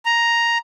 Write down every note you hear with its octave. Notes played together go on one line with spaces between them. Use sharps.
A#5